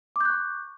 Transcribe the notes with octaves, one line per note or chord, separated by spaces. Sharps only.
C#6 D6 F#6 G6